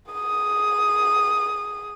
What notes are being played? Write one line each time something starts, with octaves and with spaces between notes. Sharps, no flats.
G#4 D#6